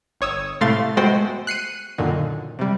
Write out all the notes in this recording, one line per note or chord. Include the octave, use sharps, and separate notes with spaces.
G1 C#5 D#6 E6
A2 C3 A3 F5 C6 A6
G#3 A3 B3 F#4 C5 G5
F#6 C7 C#7 D#7
F#2 A#2 D3 D#3
C3 G3